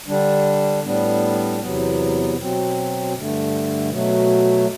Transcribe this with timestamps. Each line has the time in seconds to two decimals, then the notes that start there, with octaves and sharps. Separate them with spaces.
0.07 D3 G3 D4
0.83 A2 G3 B3 D4
1.60 E2 C3 F#3 B3
2.37 B2 F#3 C4
3.14 G2 D3 A3
3.90 B2 F#3 A3